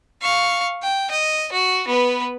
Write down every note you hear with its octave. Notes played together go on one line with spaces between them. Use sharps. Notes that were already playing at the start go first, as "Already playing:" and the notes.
F5 C#6
G5
D#5
F#4
B3 B4